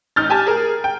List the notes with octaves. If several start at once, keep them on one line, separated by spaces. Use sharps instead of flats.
A1 D#4 F6 G6 A6
G4 G#5 A5
G#4 A#4
G5